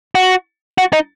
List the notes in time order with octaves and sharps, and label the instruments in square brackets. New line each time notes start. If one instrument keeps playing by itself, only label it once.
[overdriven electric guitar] F#4
F#4
D#4